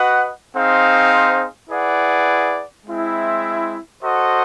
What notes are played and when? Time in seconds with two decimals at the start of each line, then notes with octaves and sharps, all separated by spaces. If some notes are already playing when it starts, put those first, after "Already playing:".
Already playing: F#4 B4 D#5 F#5
0.54 C4 D#4 G#4 C5 F5
1.70 E4 G#4 B4 D5 F#5
2.86 G#3 C4 E4
4.03 F#4 A4 C5 D#5 F#5